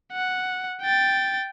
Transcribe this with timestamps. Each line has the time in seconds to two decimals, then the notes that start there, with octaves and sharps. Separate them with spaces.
0.12 F#5
0.82 G5 A6